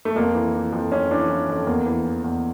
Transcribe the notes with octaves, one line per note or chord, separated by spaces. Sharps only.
A3
F2 A#3
E3
E3
F2
F2 C#4
E3 D4
E3
F2
E2 A#3
E3
E3
E2